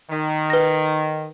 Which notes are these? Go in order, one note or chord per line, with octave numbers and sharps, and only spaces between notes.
D#3
B4 A#6